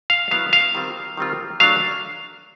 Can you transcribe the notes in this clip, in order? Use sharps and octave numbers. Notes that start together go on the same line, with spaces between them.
F5
F#3 B3 E4 F5
F5
D#3 G3 C4 F4
D#3 G3 C4 F4
F#3 A3 D4 F4 F5